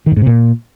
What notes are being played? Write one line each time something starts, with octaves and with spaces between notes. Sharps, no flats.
D#3
G2
G#2
C3
A#2